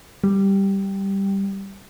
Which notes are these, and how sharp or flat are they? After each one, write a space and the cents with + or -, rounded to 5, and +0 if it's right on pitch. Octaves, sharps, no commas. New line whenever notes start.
G3 +0